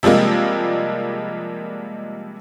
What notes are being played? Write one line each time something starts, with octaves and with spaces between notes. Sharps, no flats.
C3 F3 G3 G#3 A#3